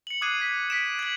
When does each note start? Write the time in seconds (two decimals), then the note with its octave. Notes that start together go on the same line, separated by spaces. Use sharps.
0.07 C#7 F#7
0.21 D6 D#6 F#6 G#6 C7 D#7
0.41 B6
0.70 B6 D7 E7
0.99 G#6 F#7